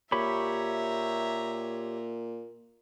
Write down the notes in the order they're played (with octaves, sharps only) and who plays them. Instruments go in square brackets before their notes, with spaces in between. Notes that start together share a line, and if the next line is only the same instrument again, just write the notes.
[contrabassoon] A#2 [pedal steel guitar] G4 C#5 B5 [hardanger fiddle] E5 A#5